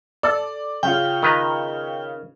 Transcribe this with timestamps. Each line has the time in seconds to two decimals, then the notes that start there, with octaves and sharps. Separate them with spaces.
0.23 A4 D5
0.83 C#3 C#4 F4 G5
1.23 D#3 B4 A#5